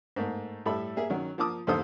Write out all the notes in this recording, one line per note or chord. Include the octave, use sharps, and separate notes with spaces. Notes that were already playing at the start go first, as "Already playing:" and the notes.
G#2 A3 A#3
A2 G3 A4 E5 B5
A#3 G#4 E5
D#3 F#3 C#4
F3 A#3 A5 D6 D#6
A1 D#2 D#3 A4 C5 D#6